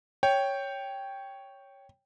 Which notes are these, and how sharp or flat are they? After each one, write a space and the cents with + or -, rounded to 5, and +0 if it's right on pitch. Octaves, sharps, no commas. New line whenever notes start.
C#5 +0 G5 +0